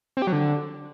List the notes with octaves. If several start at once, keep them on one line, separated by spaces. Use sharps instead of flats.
C4
G4
F#3
D3